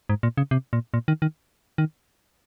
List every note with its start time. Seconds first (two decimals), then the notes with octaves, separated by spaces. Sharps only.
0.09 G#2
0.23 A#2
0.37 C#3
0.51 C3
0.73 A#2
0.94 A#2
1.08 D#3
1.22 D#3
1.78 D#3